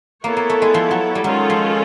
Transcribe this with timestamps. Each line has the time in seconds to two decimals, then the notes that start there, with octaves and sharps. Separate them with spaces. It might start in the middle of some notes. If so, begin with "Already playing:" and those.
0.24 A#3 B3 E4 A4 C#5
0.37 A#3
0.50 A3
0.62 G#3
0.74 F3
0.91 F#3
1.15 G3
1.24 D#3 F#3 G#3 C#4 F4 A4
1.50 F3